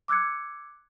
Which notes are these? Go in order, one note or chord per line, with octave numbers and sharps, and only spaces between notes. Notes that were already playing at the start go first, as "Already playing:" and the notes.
D6 E6 F#6 G#6 C#7